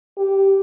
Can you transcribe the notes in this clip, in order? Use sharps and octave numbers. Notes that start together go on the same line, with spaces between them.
G4